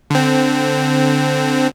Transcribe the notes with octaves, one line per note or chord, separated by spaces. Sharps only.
D3 C4